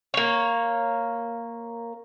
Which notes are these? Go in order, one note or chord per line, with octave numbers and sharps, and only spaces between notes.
A#3 C#5